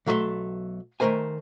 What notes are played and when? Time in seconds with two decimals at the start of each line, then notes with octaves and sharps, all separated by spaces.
0.06 B1 F#3 A3 D5 E5 C6
1.00 D#3 A3 A#3 A#4 C5 G#5